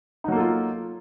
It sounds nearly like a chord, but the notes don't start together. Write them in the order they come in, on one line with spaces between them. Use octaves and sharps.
D#4 F#3 A#3 A4 F4